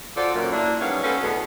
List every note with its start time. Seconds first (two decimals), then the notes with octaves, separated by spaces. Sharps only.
0.17 F4 F#4 A4 C5 D5
0.35 F#2 A#2
0.52 A#3 D4 E4
0.80 G#2 F#3 G3 B3 C#4 F5
1.03 B3 C#4 F#4 A4 B4 C5
1.22 E2 B2 D3 A3 B3 G#4